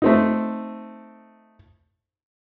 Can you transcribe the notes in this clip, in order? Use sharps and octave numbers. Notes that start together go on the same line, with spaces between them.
A3 C4 D#4